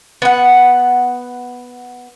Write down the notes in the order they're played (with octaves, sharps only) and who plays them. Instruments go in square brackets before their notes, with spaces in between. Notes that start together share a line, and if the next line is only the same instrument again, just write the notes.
[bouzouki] B3 F#5